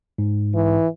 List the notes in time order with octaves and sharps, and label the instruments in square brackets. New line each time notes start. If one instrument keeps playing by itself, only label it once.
[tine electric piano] G#2
[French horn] E3